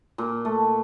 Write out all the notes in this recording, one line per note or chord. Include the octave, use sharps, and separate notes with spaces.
A#2
A3